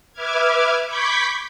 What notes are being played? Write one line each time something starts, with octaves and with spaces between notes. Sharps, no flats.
B4 E5 D6 F6 G#6
B5 C#6 D6 G6 G#6 B6